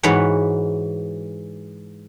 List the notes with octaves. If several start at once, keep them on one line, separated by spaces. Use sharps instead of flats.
G#2 E3 F#4 B4 C#5